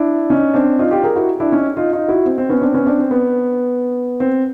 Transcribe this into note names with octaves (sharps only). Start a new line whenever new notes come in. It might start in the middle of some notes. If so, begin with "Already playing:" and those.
Already playing: D4 E4
C#4 D#4
C4 D4
D#4 F4
F4 G4
G#4 A#4
E4 F#4
D4 E4
C#4 D#4
D#4 F4
D#4 F4
E4 F#4
C4
C4
B3 C#4
C4 D4
B3 C#4
C4 D4
C4
B3
C4